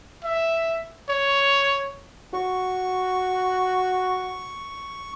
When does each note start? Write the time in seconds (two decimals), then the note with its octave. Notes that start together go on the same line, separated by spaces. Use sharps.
0.24 E5
1.09 C#5
2.33 F#4 C#6